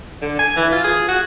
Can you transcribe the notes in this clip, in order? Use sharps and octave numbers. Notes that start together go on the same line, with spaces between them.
D3
G#5
E3
F4
G#4
F#4